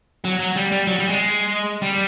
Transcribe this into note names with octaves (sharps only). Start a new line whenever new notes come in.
F#3
F#3
G3
G3
F#3
G3
G#3
G3